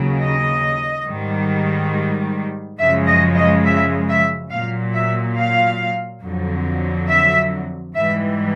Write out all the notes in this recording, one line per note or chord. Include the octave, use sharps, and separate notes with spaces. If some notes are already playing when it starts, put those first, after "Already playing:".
Already playing: D#2 C#3 F#3
D#5
G#2 D#3 G3
F#2 C#3 F3 G#3 E5
D#5
D#5
E5
E5
A#2 F#3 F5
E5
F5
F2 D3 F#3
E5
G#2 E3 G3 E5